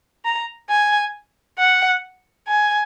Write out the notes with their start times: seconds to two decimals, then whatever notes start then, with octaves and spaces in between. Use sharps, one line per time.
0.25 A#5
0.70 G#5
1.59 F#5
2.48 G#5